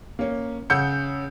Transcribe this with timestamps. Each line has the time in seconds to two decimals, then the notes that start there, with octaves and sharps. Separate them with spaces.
0.19 A#3 C#4
0.70 C#3 F#5 E6 G6 C#7